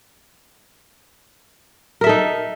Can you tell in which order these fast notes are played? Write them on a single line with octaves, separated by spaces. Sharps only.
A#4 E5 A4 D#4